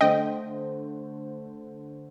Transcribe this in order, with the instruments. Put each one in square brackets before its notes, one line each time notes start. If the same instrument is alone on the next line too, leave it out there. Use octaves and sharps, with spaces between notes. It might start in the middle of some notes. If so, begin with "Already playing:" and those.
[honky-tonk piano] D3 A3 C5 [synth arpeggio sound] D#5 G5